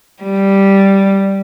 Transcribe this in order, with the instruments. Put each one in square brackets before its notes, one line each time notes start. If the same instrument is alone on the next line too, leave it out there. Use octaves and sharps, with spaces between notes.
[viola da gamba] G3